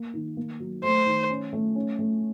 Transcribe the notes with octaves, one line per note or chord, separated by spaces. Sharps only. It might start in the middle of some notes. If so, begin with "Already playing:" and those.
Already playing: A#3
D#3
A#3
F#3
A3 C5
D#3
C#4
A3
C#4
A3